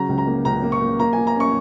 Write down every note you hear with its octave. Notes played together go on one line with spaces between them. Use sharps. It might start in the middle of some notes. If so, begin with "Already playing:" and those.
Already playing: C#3 F#3 A#5
C#2
A#5
A#3
C#2 A#5
A#3
C#6
A#3
A#3 A#5
G#5
A#3
A#5
C#4 C#6